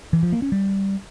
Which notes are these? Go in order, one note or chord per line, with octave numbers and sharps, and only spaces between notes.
E3
F3
A#3
C#4
G3